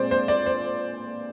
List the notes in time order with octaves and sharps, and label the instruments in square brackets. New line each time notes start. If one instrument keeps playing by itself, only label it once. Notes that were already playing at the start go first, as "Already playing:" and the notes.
Already playing: [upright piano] A#2 G#3 C4 C5 D5
C5
D5
C5